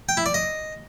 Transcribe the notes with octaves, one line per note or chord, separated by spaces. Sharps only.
G5
E4
D5
D#5